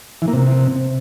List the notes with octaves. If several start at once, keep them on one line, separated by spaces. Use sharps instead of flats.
E3
A#3
C3